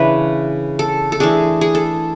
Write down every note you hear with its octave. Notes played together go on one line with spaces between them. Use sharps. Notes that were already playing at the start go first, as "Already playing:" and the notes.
Already playing: C#3 E3 D4 B4 C#5 E5
A4
A4
E3 A3 D4 G#4
G#4
A4